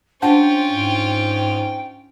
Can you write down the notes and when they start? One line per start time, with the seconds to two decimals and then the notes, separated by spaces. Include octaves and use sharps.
0.22 C#4 D4 F4 C5 F#5 G5 A5
0.70 G#2